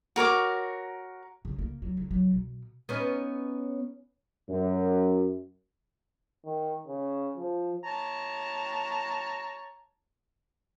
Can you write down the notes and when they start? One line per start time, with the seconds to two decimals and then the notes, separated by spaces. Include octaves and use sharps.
0.16 F#4 A#4 C#5 D6
1.45 C#3
1.59 A#3
1.82 F#3
1.97 C#3
2.11 F#3
2.33 B2
2.89 B3 C#4 D#4
4.49 F#2
6.45 D#3
6.87 C#3
7.37 F3
7.84 C#5 A5 A#5